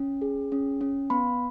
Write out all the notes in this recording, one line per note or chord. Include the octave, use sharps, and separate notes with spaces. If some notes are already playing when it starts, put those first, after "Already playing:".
Already playing: C#4
G#4
C#4
C#4
B3 B5